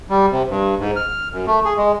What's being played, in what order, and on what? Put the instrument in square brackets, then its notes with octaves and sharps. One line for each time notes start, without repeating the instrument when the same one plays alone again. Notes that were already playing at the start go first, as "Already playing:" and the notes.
[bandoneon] G3
C3
G2
G#2
F6
F#2
A3
G#4
G#3